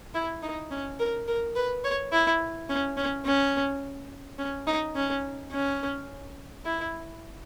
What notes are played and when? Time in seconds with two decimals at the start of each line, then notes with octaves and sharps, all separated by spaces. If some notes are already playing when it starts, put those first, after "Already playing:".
0.15 E4
0.43 D#4
0.71 C#4
0.99 A#4
1.27 A#4
1.56 B4
1.84 C#5
2.12 E4
2.69 C#4
2.97 C#4
3.25 C#4
4.38 C#4
4.67 D#4
4.95 C#4
5.52 C#4
6.65 E4